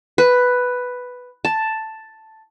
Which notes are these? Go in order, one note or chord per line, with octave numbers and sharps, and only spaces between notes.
B4
A5